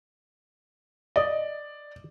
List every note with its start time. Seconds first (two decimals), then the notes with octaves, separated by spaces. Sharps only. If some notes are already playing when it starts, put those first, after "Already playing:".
1.16 D5 D#5